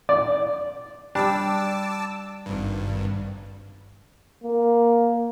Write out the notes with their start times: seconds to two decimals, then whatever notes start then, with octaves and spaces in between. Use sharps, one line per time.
0.09 D5
1.15 G3 D4 A5 D6 E6
2.46 G#1 G2
4.44 A#3